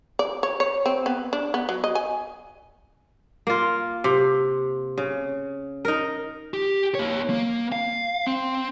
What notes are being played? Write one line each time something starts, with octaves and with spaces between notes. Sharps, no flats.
D5
C#5
C#5
C4
B3
D4
B3
F#3
D#5
G#5
A#3 F4
C3
C#3
D#4 A#4
G4
A#3 C#5
A#3
F5
C4